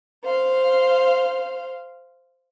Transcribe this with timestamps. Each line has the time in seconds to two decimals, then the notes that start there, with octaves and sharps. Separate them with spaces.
0.24 C5 F5